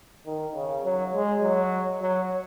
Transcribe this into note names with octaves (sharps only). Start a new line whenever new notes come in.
D#3
C#3
F#3
G#3
F#3
F#3